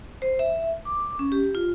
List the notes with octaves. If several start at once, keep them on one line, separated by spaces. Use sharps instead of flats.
C5
E5
D6
C#4
G4
F4